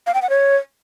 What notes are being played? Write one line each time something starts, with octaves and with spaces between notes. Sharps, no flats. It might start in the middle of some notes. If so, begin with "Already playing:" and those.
F5
G5
F#5
C#5